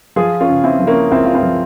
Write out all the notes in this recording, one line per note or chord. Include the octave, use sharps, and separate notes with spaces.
F3 F4 G#4
C#4 F4
C#3
C4 E4
F3 E4
A#3 C#4
C#2 C4 E4
F4
C4 E4
F3